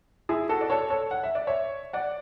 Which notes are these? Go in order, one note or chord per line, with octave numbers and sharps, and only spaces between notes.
E4 G#4
F#4 A4
D5
A4 C#5
A4 C#5
F#5
E5
D5
C#5 E5
D5 F#5